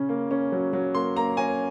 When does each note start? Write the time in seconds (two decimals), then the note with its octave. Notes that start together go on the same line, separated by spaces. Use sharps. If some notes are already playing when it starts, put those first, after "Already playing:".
Already playing: C#3 C#4
0.09 A#3
0.31 C#4
0.52 F#3
0.73 F#3
0.95 A#3 C6
1.16 A#3 A#5
1.37 C#4 G#5